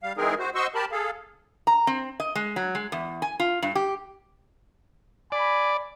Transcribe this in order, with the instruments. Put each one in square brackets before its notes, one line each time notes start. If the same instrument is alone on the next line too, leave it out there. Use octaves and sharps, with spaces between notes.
[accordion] G3 F5
E3 G#3 C4 D#4 G#4 A#4
F#4 C5
F#4 C5 D#5 C6 C#6 E6
G4 A#4 A5 B5
G#4 A4 F5
[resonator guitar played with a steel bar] A#5
C4
D#5
G#3
F#3
G#3
E2
G#5
F4
G2
G4
[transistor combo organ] D5 [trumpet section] G#5 B5